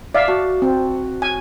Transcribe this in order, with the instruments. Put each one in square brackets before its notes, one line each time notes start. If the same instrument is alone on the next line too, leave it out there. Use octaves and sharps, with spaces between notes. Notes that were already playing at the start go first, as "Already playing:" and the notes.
[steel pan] D5 E5 F5
[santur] F#4 A5
[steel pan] C4
G#5